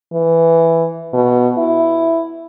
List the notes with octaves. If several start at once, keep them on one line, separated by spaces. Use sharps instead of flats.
E3
B2
E4